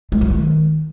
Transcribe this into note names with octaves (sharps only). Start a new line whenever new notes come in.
G#3
F#3
D#3